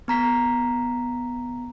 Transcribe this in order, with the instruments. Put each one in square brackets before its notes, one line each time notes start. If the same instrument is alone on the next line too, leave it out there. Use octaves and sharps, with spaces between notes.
[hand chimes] B3 A#5 B6